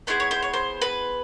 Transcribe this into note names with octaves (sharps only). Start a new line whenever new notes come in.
B3 E4 G#4 C5
C#5
C5
C#5
C5
B4